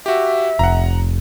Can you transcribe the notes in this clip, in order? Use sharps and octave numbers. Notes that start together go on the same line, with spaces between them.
F#4 G4 E5
F1 F#5 A#5